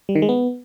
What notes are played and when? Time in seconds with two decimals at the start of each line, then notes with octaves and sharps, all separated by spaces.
0.09 G3
0.15 D#3
0.22 G#3
0.29 B3